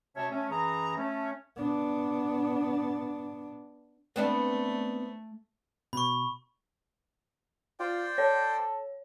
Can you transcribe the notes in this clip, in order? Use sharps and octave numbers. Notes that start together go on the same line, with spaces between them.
D2 C3 C#4 C#5 E5 A5
A3 C#4
F#2 E3 G#4 A#5
A3 C#4
B3 D4
A3 B3 C4 D4
B2 B5 C#6
F4 C5 D5 G5
A4 C#5